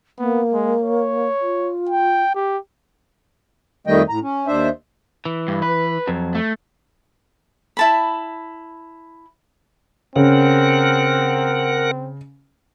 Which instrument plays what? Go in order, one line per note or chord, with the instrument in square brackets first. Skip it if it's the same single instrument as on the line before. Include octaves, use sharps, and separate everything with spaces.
[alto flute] A#3 [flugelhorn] B3
[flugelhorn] G#3
C#5
[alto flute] F4
[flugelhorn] G5
G4
[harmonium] F2 D#3 G3 A3 D#5 G5
A2 A#5
C#4
D#2 D4 C5 E5
[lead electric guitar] E3
[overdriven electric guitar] G2
B4
[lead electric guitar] F2 F#3
[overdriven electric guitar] A3
[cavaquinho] E4 A5 B5
[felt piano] C#3 [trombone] C4 [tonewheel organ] A#4 F#5